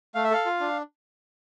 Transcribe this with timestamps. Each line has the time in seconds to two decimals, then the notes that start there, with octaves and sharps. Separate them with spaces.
0.15 A3 F5
0.24 E5
0.31 A4 F5
0.46 F4
0.60 D4